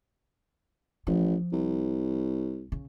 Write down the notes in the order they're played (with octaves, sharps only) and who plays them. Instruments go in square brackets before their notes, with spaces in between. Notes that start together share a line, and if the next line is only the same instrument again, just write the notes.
[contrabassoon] A1 [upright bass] F3
[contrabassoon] C2
[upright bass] C#3